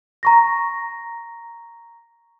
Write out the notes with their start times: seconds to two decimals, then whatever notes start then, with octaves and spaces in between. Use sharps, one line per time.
0.23 A#5 C#6 A#6